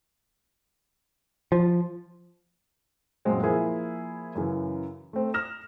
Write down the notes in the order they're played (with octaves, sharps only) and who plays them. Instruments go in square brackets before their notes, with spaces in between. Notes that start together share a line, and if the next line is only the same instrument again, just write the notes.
[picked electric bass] F3
[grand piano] F#2 A#2 F#3 G#3 C4
F3 A#3 E4 G#4 A#4
F#2 C#3 E3
A3 C4
D#6 F6 A#6 E7